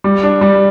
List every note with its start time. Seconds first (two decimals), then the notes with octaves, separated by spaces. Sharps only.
0.04 G3
0.23 D4
0.41 G3